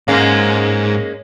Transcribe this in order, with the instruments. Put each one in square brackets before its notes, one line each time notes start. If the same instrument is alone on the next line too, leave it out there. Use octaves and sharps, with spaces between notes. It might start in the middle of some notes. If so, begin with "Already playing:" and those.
[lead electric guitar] G#2 [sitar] G#3 A#3 C#4